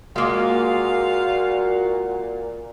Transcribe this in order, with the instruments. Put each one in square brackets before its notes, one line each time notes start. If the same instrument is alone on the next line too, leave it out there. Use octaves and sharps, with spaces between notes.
[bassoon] A#2 [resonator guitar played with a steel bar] G#3 A#3 [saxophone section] F4 F5 [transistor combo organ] F#4